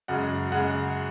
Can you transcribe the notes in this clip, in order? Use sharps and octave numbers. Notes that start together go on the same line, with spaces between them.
F#2 C#3 G#3 F#5
C#3 G#3 F#5